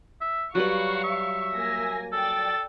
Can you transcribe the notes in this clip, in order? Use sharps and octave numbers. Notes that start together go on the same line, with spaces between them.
E5
F#3 G3 F#4 B4 F5 C#6
E5
A#3 G#5 A#6
A4 D5 G5 A6